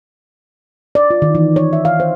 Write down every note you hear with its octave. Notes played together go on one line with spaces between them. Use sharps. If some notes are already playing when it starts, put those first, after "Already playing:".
D5
F4
D#3
E3
C#5
E5
F5
C5